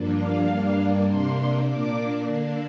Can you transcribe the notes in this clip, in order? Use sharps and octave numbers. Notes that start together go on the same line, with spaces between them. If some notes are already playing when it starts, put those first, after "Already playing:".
Already playing: G2 F3 A#3 D4
F5
G2 G3 A#3 D4
C3 A#3 D4 C6
A#2 A#3 D4 D6
D3 A#3 D4